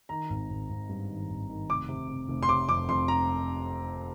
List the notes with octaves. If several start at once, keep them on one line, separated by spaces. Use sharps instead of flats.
D#3 A#5
G#1
G#1
G#1
G2
D#3
G#1
D#3
F1 D6
C3
C3
F1
C6
C3 D6
F2 D6
F2 C6
A#5